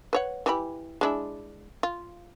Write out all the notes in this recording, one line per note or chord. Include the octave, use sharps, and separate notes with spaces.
B4 C#5 F#5
E3 G4 B5
G#3 D4 E4
F4